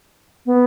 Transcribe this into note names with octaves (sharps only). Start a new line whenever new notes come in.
B3